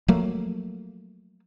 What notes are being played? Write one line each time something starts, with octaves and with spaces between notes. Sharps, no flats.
F3 F#3 A3 A#3